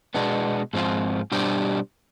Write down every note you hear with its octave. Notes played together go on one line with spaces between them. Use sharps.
B2 G#3 B3 D4
G#2 F3 C4 F4
B2 G3 D4 G4 C5